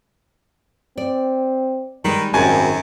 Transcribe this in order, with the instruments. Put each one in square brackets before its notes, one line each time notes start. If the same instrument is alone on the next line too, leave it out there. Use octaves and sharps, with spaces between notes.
[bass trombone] C4 [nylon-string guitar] D5
[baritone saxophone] D#3 [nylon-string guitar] G3 G#3 B4
[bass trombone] G#1 [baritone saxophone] F#2 [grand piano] G#5